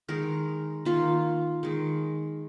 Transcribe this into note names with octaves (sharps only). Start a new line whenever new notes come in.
D#3 G#3 A#4
D#3 A#3 F4
D#3 G#3